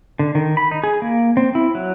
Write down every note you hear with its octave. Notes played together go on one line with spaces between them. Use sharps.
D3
D#3
B5
D#4
G#4
A#3
C4
E4
F#3